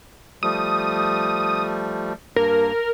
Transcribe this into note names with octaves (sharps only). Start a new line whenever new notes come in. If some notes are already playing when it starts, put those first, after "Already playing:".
F3 G3 A3 D#6
G2 A#3 A#4